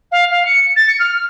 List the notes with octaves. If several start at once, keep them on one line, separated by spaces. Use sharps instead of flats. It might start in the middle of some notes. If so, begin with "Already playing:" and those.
F5
F5
C#7
A6
C#7
F6
F6